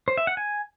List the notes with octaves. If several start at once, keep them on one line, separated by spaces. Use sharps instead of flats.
C5
E5
F#5
G#5